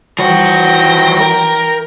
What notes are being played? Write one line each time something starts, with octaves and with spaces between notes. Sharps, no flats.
E3 F3 F#4 G5 A#6
A#4